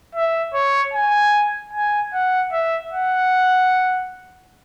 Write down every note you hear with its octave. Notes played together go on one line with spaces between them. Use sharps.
E5
C#5
G#5
G#5
F#5
E5
F#5